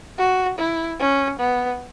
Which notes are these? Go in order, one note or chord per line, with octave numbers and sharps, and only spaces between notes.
F#4
E4
C#4
B3